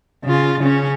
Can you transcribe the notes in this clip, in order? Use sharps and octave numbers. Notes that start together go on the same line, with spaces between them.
C#3 F4
C#3 C#4